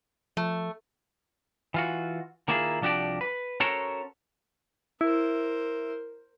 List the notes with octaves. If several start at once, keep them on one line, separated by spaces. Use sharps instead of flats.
F3 A3
E3 F4 F#4
D#3 A#3 E4 F4 G4 G#4
C2 F3 D4 F#4 G4 D5
B4
C#4 F#4 A4 A#4 C5 C#5
E4 A#4 C5